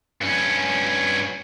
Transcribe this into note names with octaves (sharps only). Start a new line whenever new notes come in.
G2 C#4